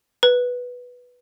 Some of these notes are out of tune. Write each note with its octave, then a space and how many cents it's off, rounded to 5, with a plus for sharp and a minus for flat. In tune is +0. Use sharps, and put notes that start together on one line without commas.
B4 -5